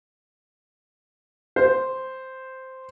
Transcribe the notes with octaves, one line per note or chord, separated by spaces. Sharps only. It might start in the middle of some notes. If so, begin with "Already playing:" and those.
C5